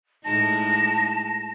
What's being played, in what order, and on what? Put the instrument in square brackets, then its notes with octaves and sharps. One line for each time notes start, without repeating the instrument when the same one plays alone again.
[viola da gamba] A2 G#3 D#4 [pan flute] A5 [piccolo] A#6